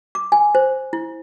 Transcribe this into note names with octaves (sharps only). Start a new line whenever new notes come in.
D6
G#5
C5
E4